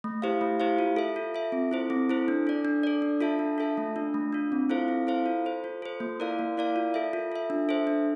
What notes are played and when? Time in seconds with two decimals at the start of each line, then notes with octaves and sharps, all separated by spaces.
0.04 A3
0.22 E4 G4 C5 F5
0.41 A3
0.60 E4 G4 C5 F5
0.79 F4
0.96 A4 E5
1.16 F4
1.35 A4 E5
1.52 C4
1.71 E4 A4 C5
1.90 C4
2.09 E4 A4 C5
2.28 D4
2.47 A4 D5
2.65 D4
2.83 A4 D5
3.02 D4
3.21 F4 A4 E5 A5
3.39 D4
3.58 F4 A4 E5 A5
3.77 A3
3.96 D4 F4
4.14 A3
4.33 D4 F4
4.52 C4
4.70 E4 A4 C5 F5
4.88 C4
5.07 E4 A4 C5 F5
5.26 F4
5.45 A4 C5
5.64 F4
5.82 A4 C5
6.00 A#3
6.20 E4 A#4 D5 F5
6.39 A#3
6.57 E4 A#4 D5 F5
6.76 F4
6.94 A4 E5
7.13 F4
7.32 A4 E5
7.50 D4
7.69 A4 C5 E5
7.87 D4